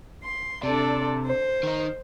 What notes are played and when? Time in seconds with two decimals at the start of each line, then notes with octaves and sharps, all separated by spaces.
0.24 C6
0.63 C3 D4 A4 D5
1.26 C5
1.63 D#3 D#4